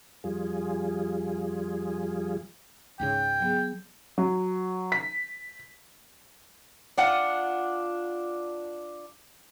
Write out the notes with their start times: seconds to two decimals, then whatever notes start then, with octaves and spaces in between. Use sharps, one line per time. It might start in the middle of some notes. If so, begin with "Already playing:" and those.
0.24 F2 G3 F4 G#4
3.00 C#2 G#2 C#3 G5
3.40 F#3 B3 G#4
4.18 F#3
4.92 B6
6.98 D4 F4 F#5